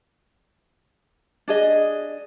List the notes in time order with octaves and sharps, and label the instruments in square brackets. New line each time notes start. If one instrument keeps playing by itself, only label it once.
[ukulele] D4 G#4 D#5